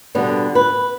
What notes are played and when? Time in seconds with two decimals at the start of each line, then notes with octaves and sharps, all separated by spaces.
0.15 B2 D3 G3 B3
0.55 B4